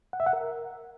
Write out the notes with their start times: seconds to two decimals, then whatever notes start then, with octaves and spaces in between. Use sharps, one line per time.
0.13 F#5
0.20 E5
0.26 F#5
0.33 A#4